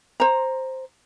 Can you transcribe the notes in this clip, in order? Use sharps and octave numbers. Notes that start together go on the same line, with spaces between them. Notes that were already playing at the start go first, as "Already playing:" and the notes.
C5 A#5